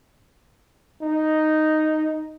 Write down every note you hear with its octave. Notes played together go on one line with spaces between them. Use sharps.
D#4